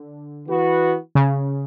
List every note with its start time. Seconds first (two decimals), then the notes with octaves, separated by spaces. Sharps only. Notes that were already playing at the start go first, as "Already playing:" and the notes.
Already playing: D3
0.48 E3 B3 F#4 B4
1.15 C#3